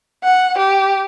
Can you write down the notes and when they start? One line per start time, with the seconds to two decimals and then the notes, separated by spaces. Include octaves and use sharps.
0.23 F#5
0.57 G4